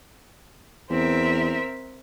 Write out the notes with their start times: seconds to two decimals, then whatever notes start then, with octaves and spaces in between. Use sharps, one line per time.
0.90 E2 C4 A#4 E5